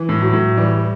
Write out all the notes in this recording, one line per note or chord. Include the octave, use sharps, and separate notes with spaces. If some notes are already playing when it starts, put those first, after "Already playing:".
Already playing: E3
A2
F#3
A2
E3 G3